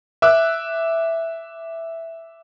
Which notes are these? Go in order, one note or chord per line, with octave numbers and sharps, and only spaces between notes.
E5 D6 E6 F#6